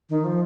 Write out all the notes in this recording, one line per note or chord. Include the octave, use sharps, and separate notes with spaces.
D#3
F3